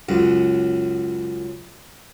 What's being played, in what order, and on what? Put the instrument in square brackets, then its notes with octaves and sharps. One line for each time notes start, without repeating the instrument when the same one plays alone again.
[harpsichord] C#2 F#2